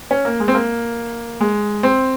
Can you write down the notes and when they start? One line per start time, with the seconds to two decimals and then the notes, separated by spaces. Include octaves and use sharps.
0.11 C#4
0.25 A#3
0.40 G#3
0.48 C4
0.54 A#3
1.40 G#3
1.83 C4